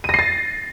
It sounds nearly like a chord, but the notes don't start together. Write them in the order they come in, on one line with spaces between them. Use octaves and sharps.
D#7 A#6 C7 A6